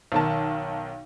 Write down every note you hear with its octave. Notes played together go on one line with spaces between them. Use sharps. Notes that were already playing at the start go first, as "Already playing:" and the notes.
B1 D#3 A5